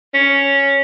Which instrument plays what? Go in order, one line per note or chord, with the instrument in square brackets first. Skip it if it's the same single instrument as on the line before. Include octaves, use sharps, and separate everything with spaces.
[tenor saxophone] C#4